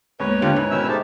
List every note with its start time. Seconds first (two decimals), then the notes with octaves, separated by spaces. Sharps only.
0.20 D#2 G#2 B3 B4 C#5
0.42 D3 F4 G4
0.56 G#2 E4
0.70 B2 D#3 C#4 E4 E5 E6
0.88 G#3 A3 D#4 G4 C5 A5